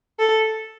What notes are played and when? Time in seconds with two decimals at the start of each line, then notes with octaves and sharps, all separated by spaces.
0.19 A4